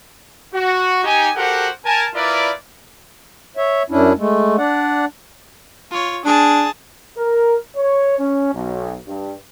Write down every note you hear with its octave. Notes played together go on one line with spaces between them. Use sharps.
F#4
D#4 G4 G#5
F#4 G4 A4 A#4 C5 F#5
A#4 G#5 A5
E4 F4 A#4 B4 D5
C#5 E5
F#2 C#4 D4 E4
G#3 A3
D4 D5 F#5
F4 C#5
D4 G#4 A5
A#4
C#5
C#4
B1
G2